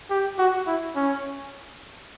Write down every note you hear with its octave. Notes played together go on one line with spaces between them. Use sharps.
G4
F#4
E4
C#4